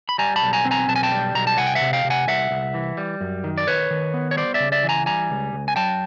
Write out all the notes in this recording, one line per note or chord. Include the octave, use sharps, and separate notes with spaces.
B5
G3 G#5 A#5
A5 B5
B1
G#5 A#5
C4
G#5 A#5
B1 A5
G#5
G5 A5
G3
B1 A#5
A5
C2 F#5 G#5
G5
E5 F#5
C3
F5 G5
C3
F#5 G#5
C2 E5 F#5
C2
E3
G3
F#2
D#3
D5
D#3 B4 C#5
D#3
B3
C#5
G3 C5 D5
D5 E5
C#3
D5 E5
E3
G#5 A#5
G3 G#5 A#5
C#2
C#2
G#5
F#3 G5 A5